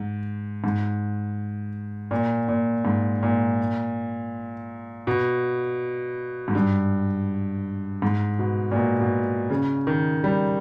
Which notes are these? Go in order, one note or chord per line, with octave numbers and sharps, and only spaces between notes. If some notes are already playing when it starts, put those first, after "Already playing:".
Already playing: G#2
G#2
A#2
A#2
G#2
A#2
B2
G#2
G2
G#2
B2
A#2
B2
B2
C#3
D#3
G3